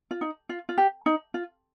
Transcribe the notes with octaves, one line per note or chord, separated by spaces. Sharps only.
F4
D#4
F4
F4
G4
D#4
F4